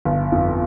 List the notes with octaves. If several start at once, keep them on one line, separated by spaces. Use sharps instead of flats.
G1
F2